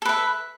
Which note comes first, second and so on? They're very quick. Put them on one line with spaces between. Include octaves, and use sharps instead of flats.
A4 B4 E5